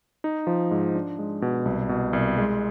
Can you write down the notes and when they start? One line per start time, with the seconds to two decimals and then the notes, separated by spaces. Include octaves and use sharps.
0.24 D#4
0.47 F3
0.71 G#2
0.95 D4
1.19 G#3
1.42 B2
1.65 C2
1.89 B2
2.13 C2
2.37 G#3